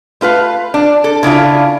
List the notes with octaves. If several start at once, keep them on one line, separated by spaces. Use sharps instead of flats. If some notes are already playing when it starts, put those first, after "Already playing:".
A3 F4 B4 F5
D4
A4
C#3 D4 E4 F4